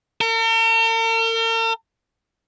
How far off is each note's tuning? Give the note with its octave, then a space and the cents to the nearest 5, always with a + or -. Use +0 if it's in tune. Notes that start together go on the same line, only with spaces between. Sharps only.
A#4 -45